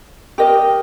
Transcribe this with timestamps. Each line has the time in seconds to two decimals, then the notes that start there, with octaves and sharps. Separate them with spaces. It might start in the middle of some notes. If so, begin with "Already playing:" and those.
0.38 G4 A#4 D#5